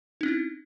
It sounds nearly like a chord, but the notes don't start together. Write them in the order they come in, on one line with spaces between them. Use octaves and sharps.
D#4 C#4 C4 E4